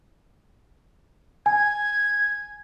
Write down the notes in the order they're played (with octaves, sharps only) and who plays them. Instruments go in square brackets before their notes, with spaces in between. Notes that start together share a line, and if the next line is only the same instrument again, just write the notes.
[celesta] G#5 [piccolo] G#6